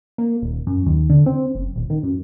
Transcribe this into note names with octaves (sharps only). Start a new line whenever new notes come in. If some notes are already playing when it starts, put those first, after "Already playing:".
A#3
D#1
F#2
D#2
D3
C4
F#1
D#1
D#3
F#2